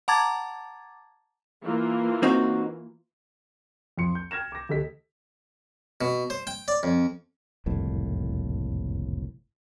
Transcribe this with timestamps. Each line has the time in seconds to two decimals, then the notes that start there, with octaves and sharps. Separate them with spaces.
0.08 F#5 A5 A#5 D6 G#6 A6
1.64 E3 A#3 F4
2.23 C4 D#4 F#4
3.98 F2 F3 C6 C#7
4.15 G6
4.31 G5 F6 G#6 A#6 E7
4.52 D6 A#6
4.69 D2 G4 A4 D#5 B6
6.01 B2
6.30 C5
6.47 G5
6.68 D5
6.83 F2
7.66 F#1 C2 F2 A2